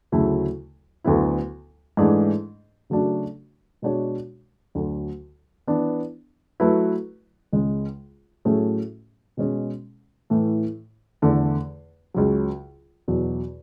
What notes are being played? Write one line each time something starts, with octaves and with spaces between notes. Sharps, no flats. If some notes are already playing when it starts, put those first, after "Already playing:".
D2 C#3 F#3 A3 E4
D2 D3 F#3 B3 E4
G#2 E3 A3 D4 G#4
C#3 F#3 A3 D4 F#4
B2 G#3 D4 F#4 C#5
D2 D3 F#3
E3 B3 D4
F#3 A3 E4 B4
C#2 C#3 G#3
A2 F#3 A3 C#4 G#4
B2 G#3 C#4
A2 E3 A3
E2 D3 A3
C#2 C#3 F#3
E2 B2 F#3